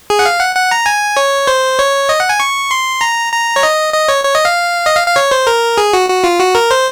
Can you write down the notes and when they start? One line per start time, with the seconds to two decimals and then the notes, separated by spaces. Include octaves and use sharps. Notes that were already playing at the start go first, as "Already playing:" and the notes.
0.10 G#4
0.19 F#5
0.26 F5
0.40 F#5
0.55 F#5
0.71 A#5
0.86 G#5
1.17 C#5
1.47 C5
1.79 C#5
2.09 D#5
2.20 F#5
2.29 G#5
2.40 C#6
2.71 C6
3.01 A#5
3.33 A#5
3.56 C#5
3.63 D#5
3.93 D#5
4.08 C#5
4.24 C#5
4.35 D#5
4.45 F5
4.86 D#5
4.96 F5
5.07 F5
5.16 C#5
5.31 C5
5.47 A#4
5.78 G#4
5.93 F#4
6.09 F#4
6.24 F4
6.40 F#4
6.55 A#4
6.71 C5